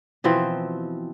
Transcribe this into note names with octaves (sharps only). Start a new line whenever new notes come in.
B2 E3 F3 C4